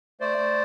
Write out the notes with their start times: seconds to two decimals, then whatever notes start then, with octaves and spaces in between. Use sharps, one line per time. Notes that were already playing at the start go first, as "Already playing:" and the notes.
0.20 A3 C5 D5
0.38 A3